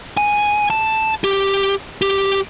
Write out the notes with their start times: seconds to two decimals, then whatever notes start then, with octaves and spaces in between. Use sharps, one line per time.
0.17 G#5
0.70 A5
1.24 G4
2.02 G4